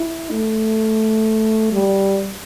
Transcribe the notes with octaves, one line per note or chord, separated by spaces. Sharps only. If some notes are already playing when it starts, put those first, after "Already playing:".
Already playing: E4
A3
G3